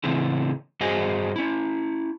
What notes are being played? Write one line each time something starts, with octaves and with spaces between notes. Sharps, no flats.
A2 C#3 E3 C4 E4
G2 F#4 G#4 C5 D#5 G#5
C#4 E4